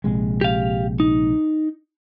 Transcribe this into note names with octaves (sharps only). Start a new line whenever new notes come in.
A#1 C3 G#3
G4 F5
D#4